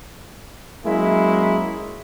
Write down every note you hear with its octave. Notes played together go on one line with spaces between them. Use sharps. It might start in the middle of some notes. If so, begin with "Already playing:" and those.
F#3 G#3 A#3 C#4 E4